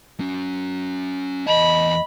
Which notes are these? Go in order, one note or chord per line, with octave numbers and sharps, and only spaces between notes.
C#4 F#4
E2 D#5 A5 B5